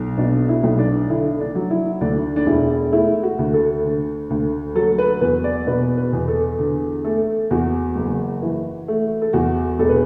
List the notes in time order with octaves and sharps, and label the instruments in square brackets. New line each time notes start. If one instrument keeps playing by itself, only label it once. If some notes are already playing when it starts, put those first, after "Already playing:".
Already playing: [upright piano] B1
B2 D4
E4
B1
D4
D3 E4
D4
F#3
E4
D2 D4
D4
E1 E4
A3 E4
F#4
D2
A4
D3
D2
F#3 A4
B4
E2 B4
D5
B2 B4
B4
E2
A4
D3
A3 A4
E2 F#4
F#1
E3
A3
A4
E2 F#4
E1 A4
B4